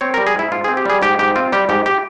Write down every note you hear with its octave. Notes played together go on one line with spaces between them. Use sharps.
C4 C#5
G3 A#4
G#4
G#2 E4
G#2 F4
C4 G#4
G4
G3 G#4
G#2 G4
G#2 G4
C4 F4
G3 G4
G#2 G4
G4